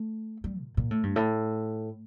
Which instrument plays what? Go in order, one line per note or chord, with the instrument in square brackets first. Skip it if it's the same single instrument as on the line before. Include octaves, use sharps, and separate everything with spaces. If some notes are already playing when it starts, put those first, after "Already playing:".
Already playing: [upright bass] A3
G3
A#2
A#2
A2
G2
A2